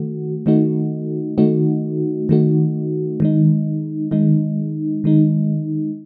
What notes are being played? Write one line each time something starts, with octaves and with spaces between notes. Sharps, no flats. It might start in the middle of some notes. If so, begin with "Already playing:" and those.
Already playing: D#3 A3 F#4
D#3 A3 D#4 F#4
D#3 A3 D#4 F#4
D#3 A3 D#4 F#4
D#3 G#3 D#4
D#3 G#3 D#4
D#3 G#3 D#4